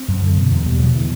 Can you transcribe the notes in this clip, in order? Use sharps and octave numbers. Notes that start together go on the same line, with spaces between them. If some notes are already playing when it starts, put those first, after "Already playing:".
Already playing: C4
F#2
D3
B2
E2 B3
E2 G3
B2 F#3
D3 E3